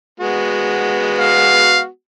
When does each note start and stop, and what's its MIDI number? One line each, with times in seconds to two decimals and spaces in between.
0.20 1.87 56
0.20 1.87 59
0.20 1.87 66
1.19 1.82 77